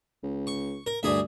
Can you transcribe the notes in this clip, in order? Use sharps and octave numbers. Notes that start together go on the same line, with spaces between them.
C#2
C#6
A#4
D2 G2 G#4 E5